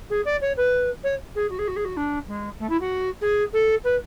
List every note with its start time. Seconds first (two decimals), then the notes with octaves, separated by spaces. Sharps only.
0.10 G#4
0.25 D5
0.41 C#5
0.57 B4
1.03 C#5
1.35 G#4
1.50 F#4
1.59 G#4
1.67 F#4
1.76 G#4
1.85 F#4
1.97 D4
2.28 G#3
2.59 A3
2.69 E4
2.80 F#4
3.21 G#4
3.53 A4
3.84 B4